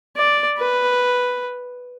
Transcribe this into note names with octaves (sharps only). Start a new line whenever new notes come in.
D5
B4